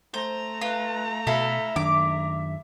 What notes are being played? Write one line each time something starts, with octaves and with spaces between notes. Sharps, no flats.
A3 C5 A#5
F4 B4
B2 E4 A4 E5 F5
F#2 D#3 D4 D6